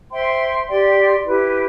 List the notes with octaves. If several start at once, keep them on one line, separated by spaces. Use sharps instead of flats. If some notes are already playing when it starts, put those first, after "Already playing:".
C5 E5 G5 C6
G4 D5 G5 C6
E4 G4 B4